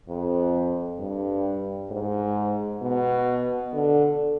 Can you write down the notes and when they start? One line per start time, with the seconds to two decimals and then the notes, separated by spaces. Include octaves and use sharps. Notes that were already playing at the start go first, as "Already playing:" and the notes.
0.09 F2
0.99 G2
1.91 G#2
2.82 B2
3.73 D3